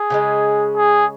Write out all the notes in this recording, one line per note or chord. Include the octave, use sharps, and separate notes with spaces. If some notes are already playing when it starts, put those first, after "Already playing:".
Already playing: G#4
C#3 F3 G#3
G#4